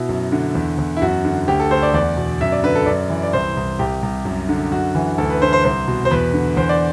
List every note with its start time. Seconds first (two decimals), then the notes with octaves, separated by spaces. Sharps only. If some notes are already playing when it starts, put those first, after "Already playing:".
Already playing: B2 E4
0.09 F#2
0.32 D3
0.55 E2
0.78 E2
0.96 E4
1.02 F#2 F#4
1.25 D3
1.48 D2 G4
1.59 A4
1.71 D2 C5
1.83 D5
1.94 E2 D5
2.17 B2
2.41 F#2 E5
2.52 D5
2.64 D3 B4
2.75 A4
2.86 F#2 D5
3.10 E3
3.23 D5
3.33 C2 C5
3.57 C2
3.79 C2 G4
4.03 C2
4.25 F#2
4.49 D3
4.72 F#2 F#4
4.95 E3
5.18 D2 A4
5.30 B4
5.42 D3 C5
5.53 C5
5.64 C2 C5
5.88 B2
6.05 C5
6.11 E2 B4
6.34 D3
6.57 E2 C5
6.69 D5